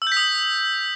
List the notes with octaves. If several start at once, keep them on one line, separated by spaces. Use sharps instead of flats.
E6
G6
B6
D#6